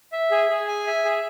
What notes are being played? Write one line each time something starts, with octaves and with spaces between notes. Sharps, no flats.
E5
G#4
G#4
G#5
E5
G#4